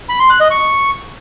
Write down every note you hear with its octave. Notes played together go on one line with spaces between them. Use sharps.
B5
C6
F#6
D#5
C#6